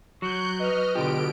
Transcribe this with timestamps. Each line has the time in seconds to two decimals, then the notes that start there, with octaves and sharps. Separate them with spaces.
0.22 F#3 C#6 F#6 G6
0.59 B4 D#5 F6
0.95 B2 D3 F4 G4 D7